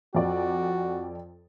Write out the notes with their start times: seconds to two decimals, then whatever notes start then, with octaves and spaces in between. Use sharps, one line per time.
0.15 F2 F#4 D5